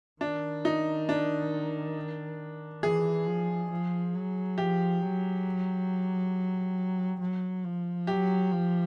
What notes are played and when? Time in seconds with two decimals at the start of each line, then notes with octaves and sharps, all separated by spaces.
0.21 D#3 D4
0.65 D#4
1.09 D4
2.83 E3 G#4
3.27 F3
3.71 F3
4.15 F#3
4.58 F3 G4
5.01 F#3
7.20 F#3
7.64 F3
8.07 F#3 G4
8.52 F3